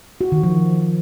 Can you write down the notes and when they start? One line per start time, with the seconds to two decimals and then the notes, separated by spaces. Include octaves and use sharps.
0.21 F#4
0.32 D#3
0.43 F3